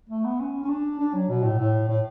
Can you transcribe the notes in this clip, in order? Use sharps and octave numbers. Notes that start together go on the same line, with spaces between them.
A3
B3
C#4
C#4
D4
D4
F#3
B2
A2
A2
A2